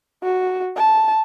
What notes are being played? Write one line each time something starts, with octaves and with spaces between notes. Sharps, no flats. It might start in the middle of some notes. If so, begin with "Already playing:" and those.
F#4
A5